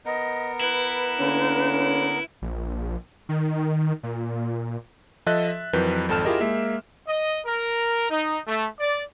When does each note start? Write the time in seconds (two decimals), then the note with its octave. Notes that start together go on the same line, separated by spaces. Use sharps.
0.05 B3 A#4 D#5
0.61 E4 B4
1.19 D3 A#3 C#4
2.42 A#1
3.29 D#3
4.03 A#2
5.26 F3 A4 D#5 E5 F#6 A6
5.48 E5
5.73 F2 E3 F#3 A#4 B4 G6
6.09 G#1 F2 A4 A5 F6 E7
6.25 E4 F4 G4 G#4 A#4 D#5
6.40 G#3 A#3 E5
7.08 D#5
7.46 A#4
8.11 D#4
8.47 A3
8.79 D5